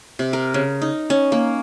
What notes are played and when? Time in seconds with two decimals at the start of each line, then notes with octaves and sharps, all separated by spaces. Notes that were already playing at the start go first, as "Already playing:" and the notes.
0.19 C3
0.33 A#4
0.54 C#3
0.82 D#4
1.10 C#4
1.32 A#3